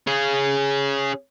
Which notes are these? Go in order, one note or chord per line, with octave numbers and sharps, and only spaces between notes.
C#4 G#4